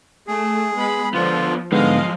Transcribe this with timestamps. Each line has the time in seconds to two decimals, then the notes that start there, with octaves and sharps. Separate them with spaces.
0.27 A3 G#4
0.76 G#3 B3 B5
1.14 D3 F3 B3 D4 F4
1.72 G#2 D3 F3 F#3 G#3 B3 D#5 F5